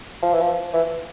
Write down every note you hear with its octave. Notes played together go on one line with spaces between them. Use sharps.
F3
E3
F3
E3